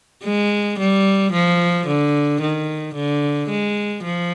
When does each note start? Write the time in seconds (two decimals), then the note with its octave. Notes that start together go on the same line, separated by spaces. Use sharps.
0.24 G#3
0.79 G3
1.32 F3
1.87 D3
2.41 D#3
2.95 D3
3.49 G#3
4.04 F3